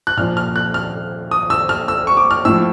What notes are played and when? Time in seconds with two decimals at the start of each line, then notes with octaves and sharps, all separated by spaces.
0.07 F#6
0.17 A#2 F3 F6
0.37 F6
0.56 F#6
0.74 F6
1.31 D#6
1.50 E6
1.69 F6
1.88 E6
2.07 C#6
2.17 D6
2.31 F6
2.45 A2 F3 E6